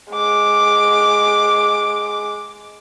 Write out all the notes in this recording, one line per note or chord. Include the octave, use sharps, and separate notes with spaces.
G#3 D6